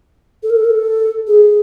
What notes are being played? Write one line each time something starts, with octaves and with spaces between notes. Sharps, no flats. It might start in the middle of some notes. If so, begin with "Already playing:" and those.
A4
A#4
A4
A#4
A4
G#4